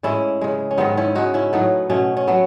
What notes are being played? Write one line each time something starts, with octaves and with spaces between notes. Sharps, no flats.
A2 G#3 C#4 E4
C#3 G#3
C#4
G#2 D#3 G#3 B3 D#4
C#4 E4
C#3 G#3 D#4 F#4
C#4 E4
A2 F#3 A3 B3 D#4
B2 A3 C#4
C#4
F#3 A3 B3